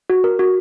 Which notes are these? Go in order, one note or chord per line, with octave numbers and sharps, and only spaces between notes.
F#4
A#4
F#4